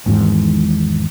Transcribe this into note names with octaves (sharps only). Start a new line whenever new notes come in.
G#1 E2 G#2